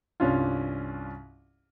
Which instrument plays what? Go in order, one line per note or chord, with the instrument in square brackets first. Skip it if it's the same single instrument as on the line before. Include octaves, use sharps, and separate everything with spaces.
[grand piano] C2 G2 C#4 D4 F4